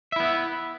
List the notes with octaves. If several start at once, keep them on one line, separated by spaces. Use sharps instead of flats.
B3 E4 E5